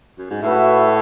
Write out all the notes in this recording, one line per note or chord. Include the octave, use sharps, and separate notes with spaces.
F#2
G#2
A2 F#4 B4 E5